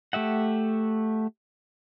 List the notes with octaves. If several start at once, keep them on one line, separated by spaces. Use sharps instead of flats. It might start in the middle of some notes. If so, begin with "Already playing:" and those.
A3 G4 E5 F#5